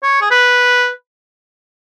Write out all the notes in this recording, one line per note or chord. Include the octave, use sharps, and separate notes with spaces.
C#5
G#4
B4